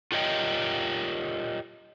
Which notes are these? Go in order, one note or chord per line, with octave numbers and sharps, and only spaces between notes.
F4 G4 A#4 C#5 D#5 G5